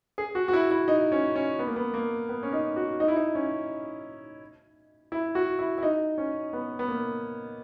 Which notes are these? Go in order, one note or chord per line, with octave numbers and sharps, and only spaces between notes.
G#4
F#4
F#4
E4
E4
D#4
C#4
C#4
B3
A#3
B3
A#3
B3
C#4
D#4
F#4
D#4
E4
D#4
C#4
E4
F#4
E4
E4
D#4
C#4
B3
B3
A#3